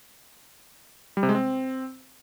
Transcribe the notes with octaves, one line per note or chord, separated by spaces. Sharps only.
G3
C3
G#3
C4